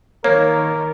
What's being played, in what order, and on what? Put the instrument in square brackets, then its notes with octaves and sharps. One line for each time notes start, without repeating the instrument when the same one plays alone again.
[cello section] D#3 [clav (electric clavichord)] A#3 [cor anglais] A#4 [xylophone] C#5